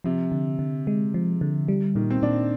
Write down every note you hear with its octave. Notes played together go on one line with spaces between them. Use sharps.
C3 F3
D3
D3
G#3
F3
D3
G3
A#2 D#3
C4
A#2 D4